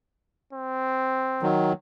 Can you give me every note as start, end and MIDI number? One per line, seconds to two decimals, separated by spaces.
0.53 1.51 60
1.42 1.73 51
1.42 1.73 54